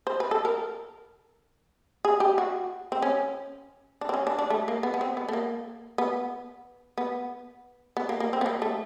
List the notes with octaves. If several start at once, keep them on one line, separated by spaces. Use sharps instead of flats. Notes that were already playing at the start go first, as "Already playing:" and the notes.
C5
B4
A4
A#4
G#4
G4
F#4
C4
C#4
D4
C4
C#4
D4
D4
A3
A#3
B3
B3
C4
B3
A3
A#3
B3
B3
B3
A#3
A#3
C4
B3
A#3
A3